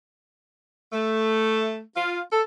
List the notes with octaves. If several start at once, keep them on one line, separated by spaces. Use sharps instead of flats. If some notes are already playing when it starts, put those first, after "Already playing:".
A3
F4
A4